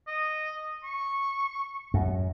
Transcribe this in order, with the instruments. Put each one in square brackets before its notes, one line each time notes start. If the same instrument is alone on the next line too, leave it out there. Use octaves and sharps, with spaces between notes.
[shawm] D#5
C#6
[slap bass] F#2